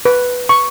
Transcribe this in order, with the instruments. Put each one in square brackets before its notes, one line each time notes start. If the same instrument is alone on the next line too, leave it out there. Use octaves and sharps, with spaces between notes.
[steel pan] B4
C#6